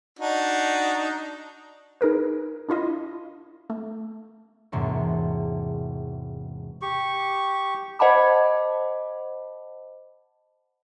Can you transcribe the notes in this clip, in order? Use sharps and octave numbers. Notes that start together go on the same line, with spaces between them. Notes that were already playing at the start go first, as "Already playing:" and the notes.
D4 D#4 F#4
D#4 G#4 A#4 B4
D4 E4 F4 D#5
A3
E1 G#2 C3 A#3 C#5
G4 C#6
C5 D#5 F#5 A5 B5 D6